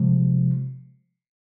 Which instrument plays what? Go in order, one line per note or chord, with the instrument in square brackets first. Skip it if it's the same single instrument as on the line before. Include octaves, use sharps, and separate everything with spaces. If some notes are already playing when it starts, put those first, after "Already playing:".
Already playing: [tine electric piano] C3 F3 G#3